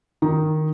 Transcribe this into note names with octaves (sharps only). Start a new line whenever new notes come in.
D#3